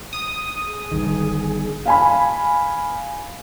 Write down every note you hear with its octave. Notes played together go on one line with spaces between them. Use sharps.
D#6
G#4
G1 G2 D#3
F5 G#5 B5